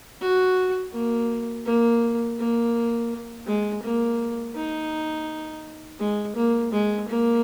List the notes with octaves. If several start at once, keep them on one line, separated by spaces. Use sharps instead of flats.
F#4
A#3
A#3
A#3
G#3
A#3
D#4
G#3
A#3
G#3
A#3